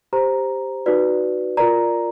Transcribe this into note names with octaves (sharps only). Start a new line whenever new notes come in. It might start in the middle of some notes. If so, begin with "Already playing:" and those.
G4 C5 A#5
D#4 F#4 B4 D5
F4 A#4 D5 A#5